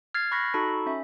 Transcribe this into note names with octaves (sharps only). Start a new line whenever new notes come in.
F6 G#6 A6 C7
B5 C#6 F#6 A#6 B6
D#4 F#4 A4 A5 B5 C#6
C#4 E5